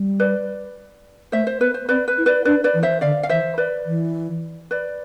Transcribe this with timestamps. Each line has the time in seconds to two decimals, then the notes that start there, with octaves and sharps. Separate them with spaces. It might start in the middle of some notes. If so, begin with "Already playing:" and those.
Already playing: G3
0.20 B4 D5
1.32 A3 C5 E5
1.47 C5
1.60 B3 B4
1.74 C5
1.89 C4 B4 D5
2.08 B4
2.18 E4
2.26 B4 D5
2.45 D4 B4 D5
2.64 B4 D5
2.74 E3
2.83 C5 E5
3.01 D3 D5 F5
3.23 F5
3.29 E3 C5 E5
3.58 B4 D5
3.86 E3
4.71 B4 D5